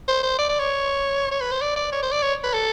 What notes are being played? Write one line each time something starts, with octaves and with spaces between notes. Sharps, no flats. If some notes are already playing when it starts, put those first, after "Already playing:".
C5
C5
D5
D5
C#5
C#5
B4
C5
D5
D5
C#5
C5
D5
C#5
B4
A4